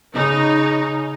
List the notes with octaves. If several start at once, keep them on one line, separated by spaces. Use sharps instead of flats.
C#3 D#4